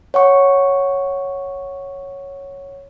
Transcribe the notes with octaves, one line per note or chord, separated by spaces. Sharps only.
C#5 F#5 C#6